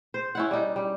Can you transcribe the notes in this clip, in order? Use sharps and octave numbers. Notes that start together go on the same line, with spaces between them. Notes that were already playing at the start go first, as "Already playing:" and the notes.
C5
C#4 E4 F#5
G3 D#4
G3